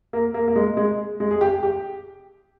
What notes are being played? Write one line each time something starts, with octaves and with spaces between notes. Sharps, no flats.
A#3
A#3
A#3
G#3
G#3
G#3
G#4
G4
G4